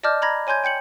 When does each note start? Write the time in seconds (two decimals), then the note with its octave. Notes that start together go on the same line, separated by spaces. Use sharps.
0.03 D5 D#5 A5 D6 F6 G6
0.22 A#5 B5 G#6 A#6
0.47 C#5 G#5 C6 G6 G#6
0.64 G5 G6 C#7 F#7